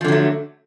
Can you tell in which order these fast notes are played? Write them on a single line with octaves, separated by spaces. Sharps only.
F3 D3 F#3 A3